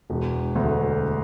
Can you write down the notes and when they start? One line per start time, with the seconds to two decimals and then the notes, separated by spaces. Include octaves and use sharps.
0.10 E1
0.56 D2 D3